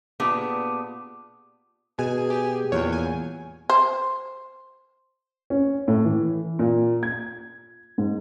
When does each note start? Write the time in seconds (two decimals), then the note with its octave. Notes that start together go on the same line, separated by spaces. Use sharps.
0.20 A#2 B3 D4 G4 G#4
1.99 B2 G#4 G#5
2.30 G4
2.72 E2 A#2 C#5
2.93 G#5
3.70 C5
5.50 C#4
5.88 A2
6.04 E3
6.59 A#2
7.03 G#6
7.98 G#2